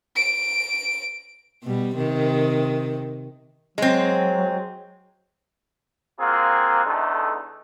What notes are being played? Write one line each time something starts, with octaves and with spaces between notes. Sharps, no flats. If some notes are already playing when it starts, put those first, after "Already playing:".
D7
B2 G3
C3 D#3
F#3 G#3 C4
A#3 C4 F4 F#4 G#4
E2 D3 A3 D#4